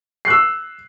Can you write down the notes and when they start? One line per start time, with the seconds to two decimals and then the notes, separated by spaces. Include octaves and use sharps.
0.25 C7
0.28 F#6
0.30 E6